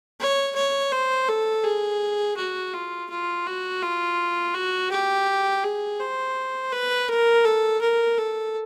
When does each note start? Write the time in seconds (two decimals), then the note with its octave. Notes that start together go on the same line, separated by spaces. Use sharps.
0.20 C#5
0.56 C#5
0.92 C5
1.28 A4
1.64 G#4
2.37 F#4
2.73 F4
3.10 F4
3.46 F#4
3.82 F4
4.54 F#4
4.91 G4
5.64 G#4
6.00 C5
6.72 B4
7.09 A#4
7.45 A4
7.81 A#4
8.18 A4